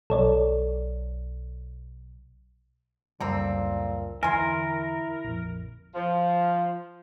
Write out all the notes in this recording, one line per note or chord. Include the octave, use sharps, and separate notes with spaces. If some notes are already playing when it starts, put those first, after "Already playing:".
B1 A4 C#5 D5
C#2 F#2 A#2 D3 G3 C4 A#5
E2 D3 E4 A#4 G#5 C6
A#1 F2
F3